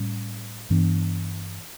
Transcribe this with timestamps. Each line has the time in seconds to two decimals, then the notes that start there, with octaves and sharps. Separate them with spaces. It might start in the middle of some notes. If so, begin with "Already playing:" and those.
Already playing: A2 G3 C#4
0.70 G2 E3 B3 D4